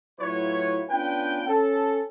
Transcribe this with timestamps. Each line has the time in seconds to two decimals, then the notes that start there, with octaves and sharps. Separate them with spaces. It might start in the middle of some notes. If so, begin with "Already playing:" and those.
0.21 A2 F#3 E4 F4 B4 C#5
0.90 B3 C#4 D4 F4 B4 G5
1.48 C#4 A4